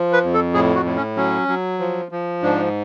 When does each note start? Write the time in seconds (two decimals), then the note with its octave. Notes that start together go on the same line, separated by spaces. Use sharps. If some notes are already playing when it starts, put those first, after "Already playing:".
Already playing: F3
0.13 B4
0.24 F2
0.34 A4
0.54 A2 G#4
0.75 F#4
0.85 A2
0.96 C#4
1.16 F#3 C#4
1.48 F#3
1.79 F3
2.11 F3
2.42 G#2 D4